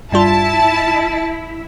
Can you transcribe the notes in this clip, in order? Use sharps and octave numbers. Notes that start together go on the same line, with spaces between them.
G2 G3 E4 F4 A5